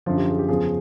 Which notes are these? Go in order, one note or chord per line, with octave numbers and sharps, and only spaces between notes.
F#2 D3 F3 F4
G4
G#4
G4
E2 C#3 F3 G#4